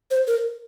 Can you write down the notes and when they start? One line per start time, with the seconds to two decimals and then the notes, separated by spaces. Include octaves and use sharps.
0.11 C5
0.27 A#4